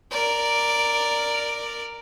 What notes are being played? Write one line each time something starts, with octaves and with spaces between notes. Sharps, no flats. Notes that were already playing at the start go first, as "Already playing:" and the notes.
A#4 D5